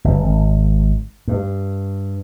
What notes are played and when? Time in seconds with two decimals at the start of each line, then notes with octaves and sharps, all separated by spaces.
0.04 G1
0.23 G#1
1.28 G2